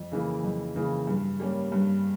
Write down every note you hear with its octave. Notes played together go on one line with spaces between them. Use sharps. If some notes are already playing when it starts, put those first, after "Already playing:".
Already playing: F2
C#3 E3 A#3
F2
C#3 E3 A#3
G2
G3 A#3 C#4
G2